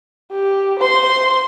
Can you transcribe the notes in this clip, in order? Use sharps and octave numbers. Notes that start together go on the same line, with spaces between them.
G4
C5 C6